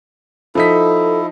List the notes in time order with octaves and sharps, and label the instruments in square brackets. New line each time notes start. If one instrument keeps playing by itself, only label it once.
[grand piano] F3 D#4 B6 [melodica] E4 [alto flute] A4